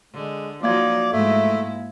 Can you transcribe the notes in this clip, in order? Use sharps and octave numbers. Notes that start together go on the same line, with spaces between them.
D3 G#3
F3 F#3 A#3 D#4 D5 F5 G#6
G#2 G#3 A3 E4